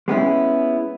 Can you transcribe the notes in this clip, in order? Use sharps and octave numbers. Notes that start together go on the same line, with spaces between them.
G#3 B3 C#4 E4